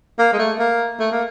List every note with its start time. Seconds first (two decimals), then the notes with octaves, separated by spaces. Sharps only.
0.19 A#3
0.33 G#3
0.39 A3
0.59 A#3
1.00 A3
1.12 A#3